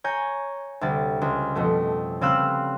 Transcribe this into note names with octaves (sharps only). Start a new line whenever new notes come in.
C#5 G#5 A#5 G6
D2 C3 G3 A6
C#2
F2 B2 A3
C#3 G3 C4 F5 E6 F#6